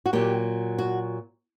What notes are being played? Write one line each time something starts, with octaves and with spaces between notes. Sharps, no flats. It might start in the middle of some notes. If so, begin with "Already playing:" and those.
F#4
A#2 F#3 G4
F#4